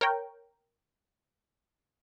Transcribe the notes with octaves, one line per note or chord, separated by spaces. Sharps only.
A#4 C#5 G5